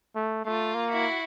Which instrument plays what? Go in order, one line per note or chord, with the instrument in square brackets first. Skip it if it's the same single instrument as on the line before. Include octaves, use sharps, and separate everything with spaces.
[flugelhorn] A3
[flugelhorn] A3 [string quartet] F4
[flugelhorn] A#3
[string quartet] E4 F#4